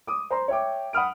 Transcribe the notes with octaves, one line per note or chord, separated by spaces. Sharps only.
D6 D#6
C5 A#5 C6
C#5 E5 G5 D6
F#5 B5 D#6 F6 D7